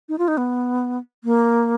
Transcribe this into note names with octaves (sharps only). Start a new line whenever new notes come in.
D#4
F4
D#4
B3
A#3